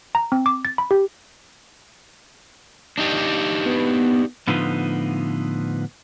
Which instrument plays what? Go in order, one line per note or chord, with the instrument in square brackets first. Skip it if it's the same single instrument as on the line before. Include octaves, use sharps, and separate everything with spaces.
[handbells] A#5
C4
D6
A6
B5
G4
[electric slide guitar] D4 D#4 G4
[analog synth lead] B3
[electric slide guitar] A2 D3 F3 B3 D#4 F4